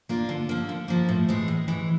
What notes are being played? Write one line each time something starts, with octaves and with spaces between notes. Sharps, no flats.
A#3 D4 F4
D3
F3 A#3
D3
F3 A#3
A2
E3 G#3
A2
E3 G#3